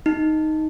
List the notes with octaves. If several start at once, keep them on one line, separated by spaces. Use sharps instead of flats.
D#4